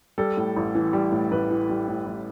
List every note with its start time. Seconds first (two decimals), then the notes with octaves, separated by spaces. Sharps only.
0.18 G3 A4
0.37 A2
0.57 A1
0.75 E3
0.93 G3
1.12 A2
1.31 A1 B4
1.51 E3
1.69 G3
1.88 A2
2.06 A1